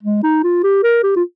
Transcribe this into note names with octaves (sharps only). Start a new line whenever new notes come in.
G#3
D#4
F4
G4
A#4
G4
F4